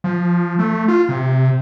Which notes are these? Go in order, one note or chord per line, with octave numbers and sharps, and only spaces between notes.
F3
A3
F4
C3